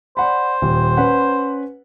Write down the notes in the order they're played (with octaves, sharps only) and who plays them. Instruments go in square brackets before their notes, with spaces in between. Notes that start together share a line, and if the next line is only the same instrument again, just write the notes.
[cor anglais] C5 [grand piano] D5 F#5 B5
[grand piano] D#1
C#4 B4 F#5